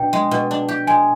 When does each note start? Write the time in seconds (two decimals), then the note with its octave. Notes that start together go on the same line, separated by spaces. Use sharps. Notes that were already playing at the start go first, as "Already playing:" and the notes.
Already playing: B2 D4 G5
0.13 G#3
0.31 B2
0.51 D4
0.68 G4
0.87 G#3 G#5